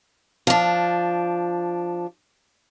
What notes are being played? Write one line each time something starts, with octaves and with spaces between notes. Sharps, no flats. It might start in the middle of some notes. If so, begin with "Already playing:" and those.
F3 D4